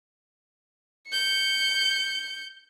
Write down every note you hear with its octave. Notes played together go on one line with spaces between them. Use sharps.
G6 C#7